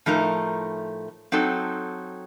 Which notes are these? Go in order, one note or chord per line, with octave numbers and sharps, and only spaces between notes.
A2 F3 A3 D#4 A#4
F#3 C4 D#4 A4